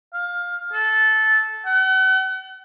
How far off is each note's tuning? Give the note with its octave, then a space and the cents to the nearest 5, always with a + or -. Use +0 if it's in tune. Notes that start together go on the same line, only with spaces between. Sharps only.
F5 +15
A4 -15
F#5 +40